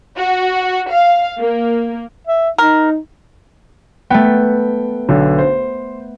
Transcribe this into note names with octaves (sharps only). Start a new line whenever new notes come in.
F#4
F5
A#3
E5
D#4 A#4
A3 B3 G5
B1 D3
C5